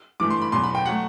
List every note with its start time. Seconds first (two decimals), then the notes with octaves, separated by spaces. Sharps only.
0.20 G2 E3 A3 D6
0.30 C6
0.41 B5
0.52 E2 B2 F#3 C6
0.63 B5
0.75 G5
0.86 F#3 A3 F#5